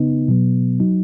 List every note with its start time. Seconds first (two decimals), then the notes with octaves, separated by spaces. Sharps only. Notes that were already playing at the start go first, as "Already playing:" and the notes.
Already playing: C#3 B3 D#4
0.28 B2 F#3 B3
0.80 F#3 D#4